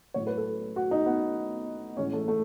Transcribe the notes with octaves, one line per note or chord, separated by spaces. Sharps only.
A2 F#3 C#5
B4
A4
F#4
D#4
B3
A2 E3 G#3 C#4
A3
A3